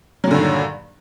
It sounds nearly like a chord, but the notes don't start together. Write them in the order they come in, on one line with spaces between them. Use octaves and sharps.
F#3 A#2 D3 G2 D#3